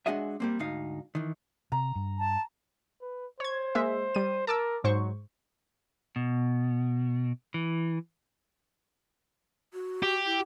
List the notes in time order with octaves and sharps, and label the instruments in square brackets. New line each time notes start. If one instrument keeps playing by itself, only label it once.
[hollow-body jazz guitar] G#3 D4 F#4 G#4 D#5 E5
G3 A#3 C4
D2 G#2 D#4 F5
D#3 E3
[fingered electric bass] C3 [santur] A#5
[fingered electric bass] G2
[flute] A5
[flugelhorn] B4
[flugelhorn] C5 [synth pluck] C#5 G#6
[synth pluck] G#3 A#3 E5
G3 D#7
[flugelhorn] A#4 [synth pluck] A5 D6 E6
[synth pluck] G#2 C5 C#6 [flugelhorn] F#3
[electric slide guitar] B2
E3
[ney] F#4
[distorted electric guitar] G4
[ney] E4